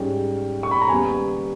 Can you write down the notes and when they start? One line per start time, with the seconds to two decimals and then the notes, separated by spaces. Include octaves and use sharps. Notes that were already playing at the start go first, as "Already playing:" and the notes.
Already playing: G#2 G3 C#4 G5
0.63 C#6
0.71 B5
0.81 A#5
0.89 D#2 C#3 G3 B3 G#5